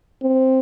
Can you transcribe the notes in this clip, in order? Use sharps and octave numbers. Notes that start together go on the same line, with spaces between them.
C4